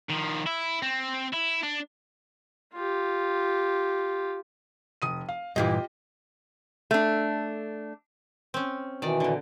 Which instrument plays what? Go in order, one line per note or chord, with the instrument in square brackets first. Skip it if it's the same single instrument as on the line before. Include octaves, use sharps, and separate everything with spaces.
[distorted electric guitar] D#3 F3
E4
C4
E4
D4
[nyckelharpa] F4 G4
[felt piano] F1 D#6 D#7
F5
[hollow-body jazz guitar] G2 A#2 E3 [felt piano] F4 G4 D#5
[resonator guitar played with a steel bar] A3 D4
[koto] C4 C#4
[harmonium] B2 E3 [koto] D#3 D5
[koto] A#2 D3